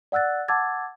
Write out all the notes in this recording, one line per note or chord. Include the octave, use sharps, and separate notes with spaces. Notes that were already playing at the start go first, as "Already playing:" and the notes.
D5 F#5 E6 F#6 A6
F#5 A5 D6 E6 G#6 A6